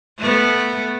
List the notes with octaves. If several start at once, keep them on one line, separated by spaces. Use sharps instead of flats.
A3 B3